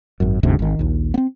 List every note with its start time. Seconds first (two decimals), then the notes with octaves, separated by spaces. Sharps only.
0.20 G#1 F#2
0.43 F#1 D2 G#2 C3
0.59 G#1 D#3
0.79 A#1 D#2
1.14 B3 C4